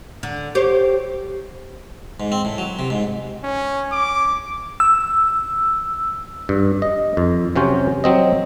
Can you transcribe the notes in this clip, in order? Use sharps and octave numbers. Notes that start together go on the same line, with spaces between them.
D3
G4 C5 C#5
G#2
C4
A2
F#3
C3
G#2
C#4
D6
E6
G2
D#5
F2
C3 F#3 C#4 C5
F#3 C4 D#5